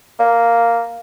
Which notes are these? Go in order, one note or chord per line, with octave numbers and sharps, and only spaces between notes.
A#3